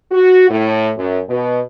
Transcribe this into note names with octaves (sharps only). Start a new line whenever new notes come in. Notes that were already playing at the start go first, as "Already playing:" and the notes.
F#4
A2
F#2
B2